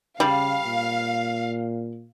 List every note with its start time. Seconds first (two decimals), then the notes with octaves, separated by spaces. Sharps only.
0.20 C#3 G3 F5
0.66 A#2